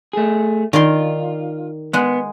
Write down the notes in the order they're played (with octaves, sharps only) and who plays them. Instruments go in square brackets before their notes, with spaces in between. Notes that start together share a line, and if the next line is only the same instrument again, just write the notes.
[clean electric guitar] A3 G#4
[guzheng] D#3 D5 C6 [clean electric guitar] F4
[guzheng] G#3 F#5 [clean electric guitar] B3